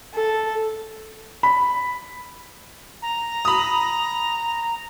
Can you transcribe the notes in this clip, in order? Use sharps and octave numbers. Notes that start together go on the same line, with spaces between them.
A4
B5
A#5
B5 D#6